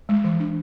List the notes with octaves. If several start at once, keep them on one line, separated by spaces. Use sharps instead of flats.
G#3
E3
D4